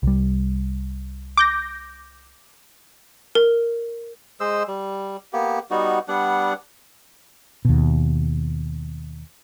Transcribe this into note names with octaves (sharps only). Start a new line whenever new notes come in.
C2 G3
D6 G6 A#6
A#4
G#3 C5 D#5 E6
G3
A#3 B3 G4
G3 B3 D#4 F#4
G3 B3 D4 F#5
D#2 B2